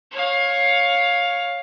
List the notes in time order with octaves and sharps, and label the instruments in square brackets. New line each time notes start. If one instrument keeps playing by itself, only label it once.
[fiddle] C#5 F5